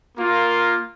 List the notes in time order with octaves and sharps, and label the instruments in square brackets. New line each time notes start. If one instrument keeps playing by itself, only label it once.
[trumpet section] A#3 F4